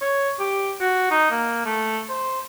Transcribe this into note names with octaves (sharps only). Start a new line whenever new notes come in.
C#5
G4
F#4
D#4
A#3
A3
C5